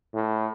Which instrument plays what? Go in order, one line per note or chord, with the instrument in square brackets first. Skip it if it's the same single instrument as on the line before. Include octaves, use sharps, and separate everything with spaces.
[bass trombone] A2